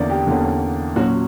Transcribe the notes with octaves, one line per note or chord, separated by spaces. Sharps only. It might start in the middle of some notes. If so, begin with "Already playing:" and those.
Already playing: E2 D3 A#3 C#4 D5 E5
G4
E2 D3 A#3 C#4
A#2 F#3 C#4 F#4